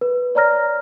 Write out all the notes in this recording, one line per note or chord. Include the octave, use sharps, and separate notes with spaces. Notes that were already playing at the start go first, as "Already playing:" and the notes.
B4
C#5 D5 A#5 F6 A#6